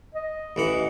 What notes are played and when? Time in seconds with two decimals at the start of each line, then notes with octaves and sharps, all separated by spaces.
0.15 D#5
0.56 A1 E3 F#5